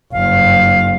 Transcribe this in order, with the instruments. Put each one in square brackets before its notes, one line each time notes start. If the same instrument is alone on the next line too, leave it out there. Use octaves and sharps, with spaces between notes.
[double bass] F#1 G2 [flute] F5